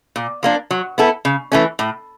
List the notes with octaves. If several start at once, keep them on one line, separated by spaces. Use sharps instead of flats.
A#2
F3 A#3 D4
F#3
B3 E4 A4
C#3
E3 A3 C#4
A2